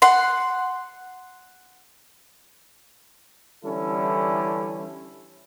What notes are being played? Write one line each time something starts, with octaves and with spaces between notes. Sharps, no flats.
F#5 C6
D3 E3 G3 C#4 E4 A4